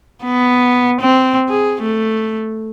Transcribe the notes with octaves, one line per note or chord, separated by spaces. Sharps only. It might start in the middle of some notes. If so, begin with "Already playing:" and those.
B3
C4
G#4
A3